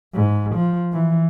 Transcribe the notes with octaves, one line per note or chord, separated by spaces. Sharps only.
G#2
F3
E3